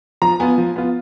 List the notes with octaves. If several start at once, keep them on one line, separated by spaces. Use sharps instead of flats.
F3 A#5
B3 F4 G#5
F3
B3 F4